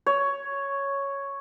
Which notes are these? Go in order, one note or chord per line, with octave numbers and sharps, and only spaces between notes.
C#5